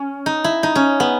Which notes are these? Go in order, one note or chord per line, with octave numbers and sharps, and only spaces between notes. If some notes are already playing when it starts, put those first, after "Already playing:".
Already playing: C#4
D#4
E4
D#4
C#4
B3